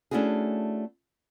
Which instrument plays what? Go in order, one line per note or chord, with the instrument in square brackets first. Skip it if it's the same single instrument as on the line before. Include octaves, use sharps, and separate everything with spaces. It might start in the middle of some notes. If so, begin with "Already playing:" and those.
[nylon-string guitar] A3 C#4 D4 E4 F#4 G#4